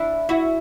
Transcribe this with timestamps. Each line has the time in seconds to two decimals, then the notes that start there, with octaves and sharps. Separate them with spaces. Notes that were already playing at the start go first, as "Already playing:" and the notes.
Already playing: D4 E4
0.29 E4 F#4